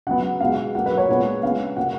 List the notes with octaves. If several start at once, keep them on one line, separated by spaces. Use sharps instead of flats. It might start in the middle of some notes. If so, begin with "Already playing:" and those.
C#3 F#3 B3 F#5
B2 G#3 B3 F5
B2 F#3 A#3 F#5
B4
C#5
A#2 G#3 B3
C#3 G#3 B3 F5
B2 A#3 F#5